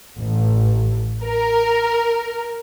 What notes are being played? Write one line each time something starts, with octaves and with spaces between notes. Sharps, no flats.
A1
A#4